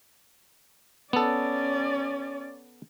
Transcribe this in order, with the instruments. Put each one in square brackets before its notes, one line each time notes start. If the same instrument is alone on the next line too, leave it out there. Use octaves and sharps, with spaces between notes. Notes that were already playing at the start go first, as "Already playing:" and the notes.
[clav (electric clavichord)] B3 A4 [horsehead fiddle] C#4 D5